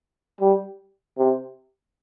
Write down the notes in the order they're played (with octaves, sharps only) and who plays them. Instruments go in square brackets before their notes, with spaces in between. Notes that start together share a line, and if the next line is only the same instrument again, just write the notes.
[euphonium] G3
C3